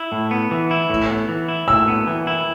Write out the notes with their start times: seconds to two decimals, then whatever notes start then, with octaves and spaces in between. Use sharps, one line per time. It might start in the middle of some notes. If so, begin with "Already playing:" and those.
Already playing: E4
0.12 A2
0.31 B3
0.51 E3
0.71 E4
0.90 A2
1.10 B3
1.29 E3
1.48 E4
1.68 A2 E6
1.88 B3
2.07 E3
2.27 E4